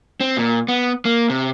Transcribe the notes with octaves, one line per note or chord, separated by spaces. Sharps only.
C4
A#2
B3
A#3
C3